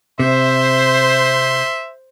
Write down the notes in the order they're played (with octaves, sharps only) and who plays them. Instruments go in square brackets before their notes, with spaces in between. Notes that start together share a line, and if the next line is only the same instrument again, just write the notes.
[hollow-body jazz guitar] C3 [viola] C5 [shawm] E5 [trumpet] C6